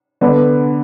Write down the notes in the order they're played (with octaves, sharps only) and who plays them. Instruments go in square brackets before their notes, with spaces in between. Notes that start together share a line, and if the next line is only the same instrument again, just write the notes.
[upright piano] D3 B3 D4